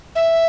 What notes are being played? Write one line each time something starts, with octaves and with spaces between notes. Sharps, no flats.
E5